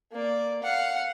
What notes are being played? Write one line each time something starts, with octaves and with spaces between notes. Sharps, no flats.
A#3 D5
F5 F#5